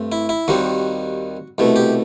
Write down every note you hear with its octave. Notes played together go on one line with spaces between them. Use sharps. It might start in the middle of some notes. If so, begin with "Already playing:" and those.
Already playing: G2 A3 C4
E4
E4
D#2 D#3 G3 C4 F#4
C2 B2 A3
G4